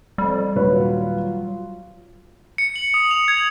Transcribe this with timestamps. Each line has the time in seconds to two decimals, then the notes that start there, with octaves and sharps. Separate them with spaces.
0.18 F2 G3
0.56 D#1 F#3 F4 B4 C#5
2.58 C#7
2.76 F#7
2.94 D#6
3.11 F7
3.28 G#6